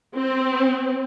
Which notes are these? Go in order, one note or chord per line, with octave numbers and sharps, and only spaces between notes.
C4